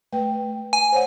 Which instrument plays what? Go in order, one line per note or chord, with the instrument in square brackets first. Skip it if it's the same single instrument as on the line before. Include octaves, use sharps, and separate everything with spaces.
[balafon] A3 B4 G5
[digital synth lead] G#5
[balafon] C5 C#5 F#5